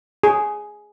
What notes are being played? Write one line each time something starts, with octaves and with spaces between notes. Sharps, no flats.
G#4